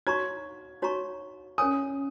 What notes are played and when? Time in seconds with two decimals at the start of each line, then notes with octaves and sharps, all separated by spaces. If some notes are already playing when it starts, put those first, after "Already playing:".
0.07 D#4 F#4 C#5 A#5 C#6 G#6
0.82 D#4 F#4 C#5 A#5 C#6
1.58 C#4 A#4 C#5 G#5 D#6